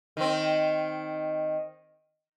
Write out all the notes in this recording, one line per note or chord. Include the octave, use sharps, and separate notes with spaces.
D#3 C4